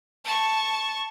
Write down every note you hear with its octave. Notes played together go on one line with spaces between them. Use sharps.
A5 C#6